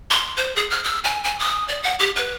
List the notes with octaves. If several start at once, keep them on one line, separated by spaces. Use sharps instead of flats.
C6
C5
G#4
F6
E6
G#5
G#5
D#6
D5
F#5
G4
B4